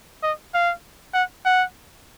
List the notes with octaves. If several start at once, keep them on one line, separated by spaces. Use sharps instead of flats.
D#5
F5
F#5
F#5